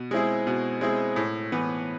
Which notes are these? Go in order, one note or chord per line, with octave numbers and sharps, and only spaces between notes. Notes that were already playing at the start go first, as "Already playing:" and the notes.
Already playing: B2
G#3 C4 E4 G#4
B2
G#3 C4 E4 G#4
A2
E3 B3